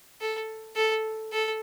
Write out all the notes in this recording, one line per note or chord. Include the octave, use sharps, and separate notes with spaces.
A4
A4
A4